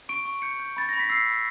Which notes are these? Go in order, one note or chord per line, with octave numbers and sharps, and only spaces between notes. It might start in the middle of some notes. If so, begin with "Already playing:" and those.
C#6 D7
C#6
G6 C#7
G6
B5 A6
B5 A#6
B6
E6 C7
B5